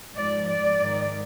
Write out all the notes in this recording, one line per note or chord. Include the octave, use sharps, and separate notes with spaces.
G#2 F3 D5
D5
G#2 D#3